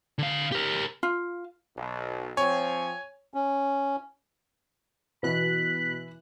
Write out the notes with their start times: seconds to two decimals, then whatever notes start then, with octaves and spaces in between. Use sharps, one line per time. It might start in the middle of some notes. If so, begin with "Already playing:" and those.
0.18 D3 F5
0.52 G4 A#4
1.03 F4
1.77 B1
2.37 F3 C4 C#5 G#5
3.34 C#4
5.23 B2 E3 E4 B4 B5 F#6